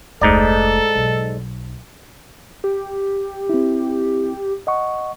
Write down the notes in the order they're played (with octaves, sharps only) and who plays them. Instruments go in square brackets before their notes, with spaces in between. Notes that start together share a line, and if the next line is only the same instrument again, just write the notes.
[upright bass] F1 D2 [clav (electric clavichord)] G#2 D#4 D5 [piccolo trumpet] A4
[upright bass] B1
[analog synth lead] G4
[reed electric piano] C4 E4
D#5 F#5 C#6